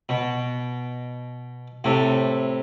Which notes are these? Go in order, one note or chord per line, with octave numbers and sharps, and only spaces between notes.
B2
A2 C3